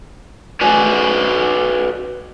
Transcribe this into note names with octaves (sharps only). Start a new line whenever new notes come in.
F#4 G#4 B4 C#5 D5 G#5